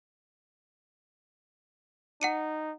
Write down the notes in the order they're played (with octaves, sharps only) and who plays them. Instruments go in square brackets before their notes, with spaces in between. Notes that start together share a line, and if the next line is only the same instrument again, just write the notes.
[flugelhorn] D#4 [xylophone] F#5 C#7 D#7